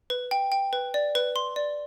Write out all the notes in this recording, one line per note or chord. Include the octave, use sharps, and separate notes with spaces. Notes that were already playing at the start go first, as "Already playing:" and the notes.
B4
G5
G5
B4
D5
B4
C6
D5